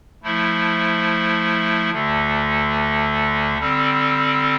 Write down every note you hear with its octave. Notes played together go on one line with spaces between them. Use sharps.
F3 A3 E4
D2 D3 A3
D3 G3 C4